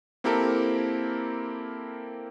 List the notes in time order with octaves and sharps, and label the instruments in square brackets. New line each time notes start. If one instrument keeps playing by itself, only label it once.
[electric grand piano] A#3 C4 E4 G4 A4 A#4